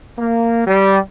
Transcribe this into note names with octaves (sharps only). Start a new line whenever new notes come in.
A#3
G3